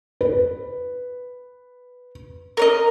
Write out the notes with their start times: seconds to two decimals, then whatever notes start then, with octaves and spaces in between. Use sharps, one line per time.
0.21 B4
2.57 A#4 C#5 D#5